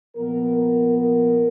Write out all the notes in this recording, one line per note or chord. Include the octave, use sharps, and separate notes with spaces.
A#2 F3 B3 A#4
A#4
A#4